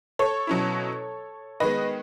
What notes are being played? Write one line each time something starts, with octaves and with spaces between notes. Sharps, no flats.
A4 C#5
B2 F#3 C#4 E4
D#3 G#3 B3 B4 D#5